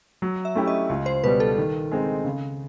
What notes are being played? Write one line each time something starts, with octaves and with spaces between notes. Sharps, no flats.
F#3
E5
A3 C#4 E4 G4
D#5
C#2
C5
B2 G3 B4
A4
D#3
G#3 C4 D#4
C#3